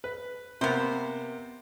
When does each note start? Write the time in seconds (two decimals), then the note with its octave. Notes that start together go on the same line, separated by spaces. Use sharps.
0.04 B4
0.61 C3 A#3 B3 C5